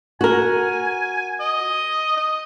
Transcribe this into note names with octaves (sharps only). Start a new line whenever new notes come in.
F#4 A#4 G#5
D#5
D#5